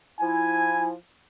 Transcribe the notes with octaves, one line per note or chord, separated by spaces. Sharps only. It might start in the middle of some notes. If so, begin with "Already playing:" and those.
F3 E4 G#5